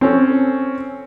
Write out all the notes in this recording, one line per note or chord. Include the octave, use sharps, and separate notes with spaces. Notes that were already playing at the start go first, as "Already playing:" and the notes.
C4 C#4 A4